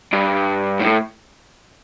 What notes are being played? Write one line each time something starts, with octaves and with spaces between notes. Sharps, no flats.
G2
A2